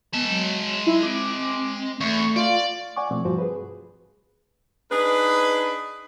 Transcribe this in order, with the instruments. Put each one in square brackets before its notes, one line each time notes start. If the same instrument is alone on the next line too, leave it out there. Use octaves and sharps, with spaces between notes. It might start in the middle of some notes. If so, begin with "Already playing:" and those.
[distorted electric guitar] G#3 A5 [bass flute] B3
[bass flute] F#3
[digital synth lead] E4
[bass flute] C4 [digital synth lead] D6
[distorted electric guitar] E2 [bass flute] A3 [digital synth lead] C#6
[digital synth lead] F4 [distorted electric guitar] D5
[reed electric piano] D5 F#5 G#5 C#6 D6
B2 F3 A3 C4
G2 F3 F#4 C5
G#4 B4
[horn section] D4 D#4 G#4 B4